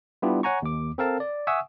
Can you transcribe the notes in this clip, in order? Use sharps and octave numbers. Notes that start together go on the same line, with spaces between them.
G3 B3 D4 E4 F4 G4
C#5 F#5 G#5 A#5 C#6
D#2 D6
C4 A4 A#4 F5 A5
D5
E5 F#5 G#5 C#6 D#6 E6